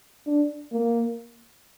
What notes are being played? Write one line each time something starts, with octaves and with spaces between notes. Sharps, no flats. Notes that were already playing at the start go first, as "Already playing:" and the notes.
D4
A#3